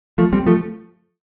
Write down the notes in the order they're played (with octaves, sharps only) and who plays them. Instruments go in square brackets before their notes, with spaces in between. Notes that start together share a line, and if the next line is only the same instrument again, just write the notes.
[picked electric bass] F3 A3
G3 C4
F3 A3